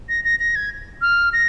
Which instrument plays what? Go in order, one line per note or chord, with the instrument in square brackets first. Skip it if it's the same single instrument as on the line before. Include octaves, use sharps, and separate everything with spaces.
[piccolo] A#6
A#6
A#6
G#6
F6
A#6